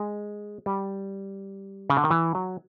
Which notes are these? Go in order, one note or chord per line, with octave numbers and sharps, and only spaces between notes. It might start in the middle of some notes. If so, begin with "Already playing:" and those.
Already playing: G#3
G3
C#3
D3
D#3
E3
F#3